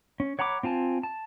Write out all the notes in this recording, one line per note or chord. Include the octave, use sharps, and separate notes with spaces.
C#4
C#5 F#5 A#5 B5 D6
C4 F4 G#5 A5
A5